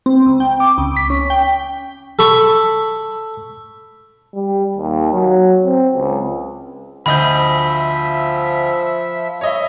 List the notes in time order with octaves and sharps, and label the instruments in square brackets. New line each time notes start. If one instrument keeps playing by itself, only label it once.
[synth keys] C4
C#2
G5
D6
C#2
B6
C#4
G5
[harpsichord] A4 B5 C#6
[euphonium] G3
D#2
F#3
C4
C#2
[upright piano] D2 D#5 G6 [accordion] F3 E5 [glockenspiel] B5
[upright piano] C#5 D#5 E5